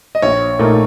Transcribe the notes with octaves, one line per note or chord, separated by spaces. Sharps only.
D#5
A#1 C#5
A#2 A3 D#4 A#4